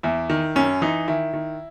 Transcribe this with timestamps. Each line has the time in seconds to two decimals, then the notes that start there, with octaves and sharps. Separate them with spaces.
0.03 E2 E4
0.30 D#3
0.55 F#2 C#4
0.82 E3 D#4
1.08 D#3 E4
1.33 D#3